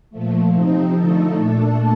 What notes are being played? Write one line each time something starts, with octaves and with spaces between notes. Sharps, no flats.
A#2 F3 A3
C3 F3 C4 D#4
D3 F3 A3 D#4 A4
A#2 A3 D4 A4